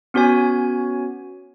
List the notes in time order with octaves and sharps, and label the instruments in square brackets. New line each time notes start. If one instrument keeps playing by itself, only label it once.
[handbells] B3 C#4 F#4 C#5 G#5